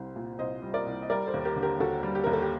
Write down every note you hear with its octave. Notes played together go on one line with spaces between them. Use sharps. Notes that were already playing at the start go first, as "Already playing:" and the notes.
Already playing: C2 G3 C5
A#2
C2 C5 D#5
G3
A#4 D5
C2
D#5
G3 A#4 D5
A4 C5
D#2
G4 A#4
D3
G4 A#4
D#2 F#4 A4
G3
G4
D#2 A#4
A4
G4